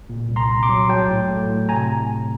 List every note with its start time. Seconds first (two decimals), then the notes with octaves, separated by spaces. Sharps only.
0.09 A#2
0.29 C2
0.36 A#5 C6
0.49 C2
0.63 C6 D6
0.69 F#3
0.89 F#3 G5 A5
1.10 A2
1.29 A3
1.49 A2
1.69 C3 G#5 A#5